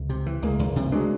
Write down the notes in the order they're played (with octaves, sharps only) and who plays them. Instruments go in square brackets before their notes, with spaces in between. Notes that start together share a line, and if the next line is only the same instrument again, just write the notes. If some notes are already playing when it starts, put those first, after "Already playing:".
Already playing: [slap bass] C#2
C3
E3
[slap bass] C#2 [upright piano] G#3 A#3
[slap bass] C#2
C3
[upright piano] F#3 G#3 [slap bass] D4